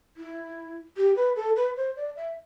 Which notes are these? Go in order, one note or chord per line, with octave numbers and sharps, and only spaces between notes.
E4
G4
B4
A4
B4
C5
D5
E5